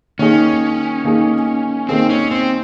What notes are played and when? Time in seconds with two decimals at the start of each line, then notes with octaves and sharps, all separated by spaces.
0.19 D#3 A#3 C#4 D#4 G#4
1.05 D#3 A#3 D#4 G#4
1.89 D#3 A#3 C4 D#4 G#4
2.10 C#4
2.31 C4